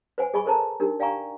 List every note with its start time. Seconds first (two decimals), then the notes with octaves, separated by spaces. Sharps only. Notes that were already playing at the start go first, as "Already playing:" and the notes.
0.18 B4 C5 F#5 G#5
0.34 G#4 D#5 G#5 B5 C#6
0.46 A4 A#4 C5 D#5 A5 A#5
0.80 D4 D#4 G4 A#4
1.00 D5 F5 G5 G#5 A#5 C#6